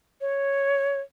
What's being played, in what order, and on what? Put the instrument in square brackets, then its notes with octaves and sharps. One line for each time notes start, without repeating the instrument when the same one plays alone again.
[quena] C#5